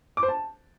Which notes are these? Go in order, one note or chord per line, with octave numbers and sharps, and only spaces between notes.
D6
C5
A5